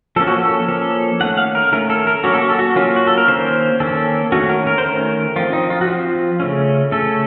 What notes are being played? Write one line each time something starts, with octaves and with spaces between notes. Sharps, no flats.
F3 A#3 C#4 A4
F#4
A4
F3 A#3 C#4 A4
D#3 A3 C#4 F#5
F5
A#4
D#3 A3 C#4 A#4
A4
A#4
F#3 A#3 C#4 F#4
A4
F#4
A4
F#4
F#3 A#3 C#4 F4
F#4
A4
A#4
D#3 A#3 C#4 C5
D#3 A#3 C#4 A4
D#3 A3 C#4 F#4
A#4
A#4
C5
D#3 A3 C#4 A#4
F3 C4 F4
D#4
F4
F#4
F3 C4 F4
C#3 A3 C#4
C#3 A3 C#4 A4